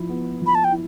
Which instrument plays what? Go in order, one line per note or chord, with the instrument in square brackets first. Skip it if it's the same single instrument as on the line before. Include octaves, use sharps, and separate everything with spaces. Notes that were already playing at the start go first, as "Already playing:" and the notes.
Already playing: [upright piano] F3 E4
B3
[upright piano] F3 [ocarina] B5
[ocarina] A5
G5
[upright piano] E4